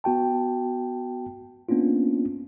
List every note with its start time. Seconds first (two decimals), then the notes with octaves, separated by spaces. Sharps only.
0.04 B3 F#4 G5 A5
1.69 A#3 B3 C#4 D4 F4